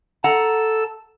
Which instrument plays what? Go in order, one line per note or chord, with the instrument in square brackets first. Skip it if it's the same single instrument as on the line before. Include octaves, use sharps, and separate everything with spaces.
[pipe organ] A4 E6 [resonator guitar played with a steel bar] F#5 A#5